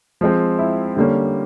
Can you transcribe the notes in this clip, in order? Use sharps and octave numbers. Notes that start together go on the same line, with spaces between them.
F3 G#3 C4
E4
D3 G3 A#3 C#4